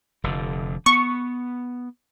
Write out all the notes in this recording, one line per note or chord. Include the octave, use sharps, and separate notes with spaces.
F1 D3
B3 C#6